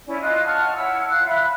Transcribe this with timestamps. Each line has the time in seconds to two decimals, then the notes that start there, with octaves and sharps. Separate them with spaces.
0.07 C#4 E4 D5
0.21 F4 D#5 F#6
0.45 F#5 A5 C#6 F6
0.76 E4 C#5 F#5 E6
1.09 F4 F5 F#6
1.26 E5 B5 F#6